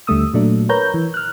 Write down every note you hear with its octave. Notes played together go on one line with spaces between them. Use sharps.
D#2 D3 G3 A3 D#6 E6
A#2 F#3 A3 D4
A#4 B4 C#5 A#5 G6
E3
F6 F#6